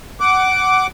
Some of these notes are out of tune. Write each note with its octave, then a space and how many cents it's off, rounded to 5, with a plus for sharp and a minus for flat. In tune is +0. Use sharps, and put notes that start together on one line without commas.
F#5 +15 D6 -10